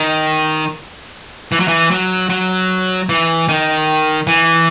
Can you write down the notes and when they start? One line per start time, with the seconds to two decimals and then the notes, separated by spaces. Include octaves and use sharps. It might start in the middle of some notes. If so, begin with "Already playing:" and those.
Already playing: D#3
1.52 E3
1.60 F#3
1.68 E3
1.91 F#3
2.30 F#3
3.09 E3
3.49 D#3
4.27 E3